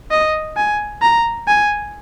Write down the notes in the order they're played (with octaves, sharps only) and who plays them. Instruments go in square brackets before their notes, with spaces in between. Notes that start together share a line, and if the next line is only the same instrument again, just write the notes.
[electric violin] D#5
G#5
A#5
G#5